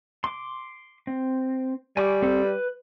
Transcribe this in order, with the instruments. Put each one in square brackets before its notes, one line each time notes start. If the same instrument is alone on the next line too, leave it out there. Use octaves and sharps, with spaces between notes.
[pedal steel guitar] C6 D6
C4
[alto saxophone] G3 [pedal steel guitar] G#5 C#6 D6
[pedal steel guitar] C4 A4
B4